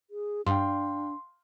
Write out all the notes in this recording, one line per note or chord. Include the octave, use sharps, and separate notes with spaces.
G#4
G2 D4 F5 G5 C6